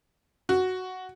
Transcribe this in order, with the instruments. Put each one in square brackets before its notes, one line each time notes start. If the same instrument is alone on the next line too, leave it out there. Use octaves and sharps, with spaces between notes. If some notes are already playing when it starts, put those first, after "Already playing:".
[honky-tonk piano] F#4